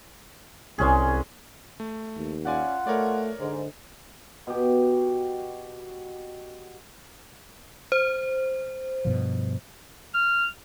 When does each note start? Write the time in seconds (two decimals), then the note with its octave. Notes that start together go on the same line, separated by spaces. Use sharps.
0.78 C2 G#3 C#4 G#4
1.80 A3
2.16 D#2
2.45 C#4 F4 D5 F#5 G#5
2.87 A3 A#4 C#5 D5
3.40 G#2 D3
4.47 B2 G4
7.92 C5
9.05 G2 B2 F3
10.15 F6